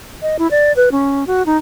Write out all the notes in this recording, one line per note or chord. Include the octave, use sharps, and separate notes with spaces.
D#5
E4
D5
B4
C#4
F#4
D#4